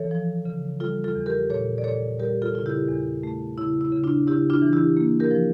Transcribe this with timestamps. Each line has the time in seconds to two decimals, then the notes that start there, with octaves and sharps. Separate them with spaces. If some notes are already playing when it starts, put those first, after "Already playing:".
Already playing: E3 A4 C#5
0.11 F3
0.45 C#3
0.80 G3 F4 A4
1.04 F4 A4
1.15 E2
1.26 G4 A#4
1.50 A#2 A4 C#5
1.78 D5
1.84 A#2 A4 C#5
2.19 G3 G4 A#4
2.42 F4 A4
2.54 C#3 F4
2.66 E4 G4
2.88 E2
3.23 A3
3.58 C#3 E4
3.81 E4
3.92 C#3
4.04 D4 F4
4.27 C#3 E4 G4
4.50 D4 F4
4.62 E3
4.73 E4 G4
4.97 A#3
5.20 G4 A#4
5.31 F3